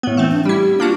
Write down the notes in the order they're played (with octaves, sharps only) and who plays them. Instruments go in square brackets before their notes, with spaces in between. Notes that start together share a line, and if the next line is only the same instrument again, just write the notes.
[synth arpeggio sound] A2 B3
[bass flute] E3 [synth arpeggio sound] A3 C4
[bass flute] D4
[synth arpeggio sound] G3 E4 [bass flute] G4
[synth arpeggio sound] A#3 D4 F#4 [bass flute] F4